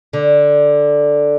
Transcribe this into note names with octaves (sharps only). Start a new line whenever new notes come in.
D3